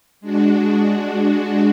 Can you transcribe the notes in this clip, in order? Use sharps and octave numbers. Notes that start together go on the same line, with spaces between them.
G#3 D4 F#4